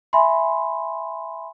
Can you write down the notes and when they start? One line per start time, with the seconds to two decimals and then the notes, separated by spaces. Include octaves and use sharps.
0.13 E5 G#5 B5 C6